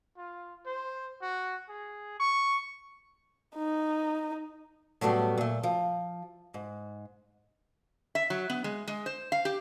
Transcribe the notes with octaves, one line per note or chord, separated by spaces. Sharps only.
F4
C5
F#4
G#4
C#6
D#4
A2 F#3 G3 A3 B3
A#2 A3
F3
G#2
E5
F#3
B3
G#3
G#3
C5
F5
G4